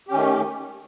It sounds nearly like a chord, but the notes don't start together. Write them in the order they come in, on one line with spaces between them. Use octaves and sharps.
G4 C#4 D#3 A3